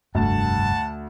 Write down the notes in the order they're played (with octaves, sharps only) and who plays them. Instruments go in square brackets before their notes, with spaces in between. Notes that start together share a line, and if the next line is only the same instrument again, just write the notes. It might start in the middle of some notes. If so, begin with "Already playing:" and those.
[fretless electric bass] F1 G2 [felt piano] D2 [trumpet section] F#5 A5